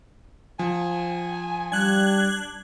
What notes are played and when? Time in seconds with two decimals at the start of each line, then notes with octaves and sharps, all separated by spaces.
0.59 F3 G#5
1.72 G3 D4 F#6 G#6